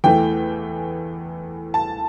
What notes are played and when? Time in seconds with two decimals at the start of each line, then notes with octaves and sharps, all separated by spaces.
0.04 E2 E3 A3 G5
1.74 A5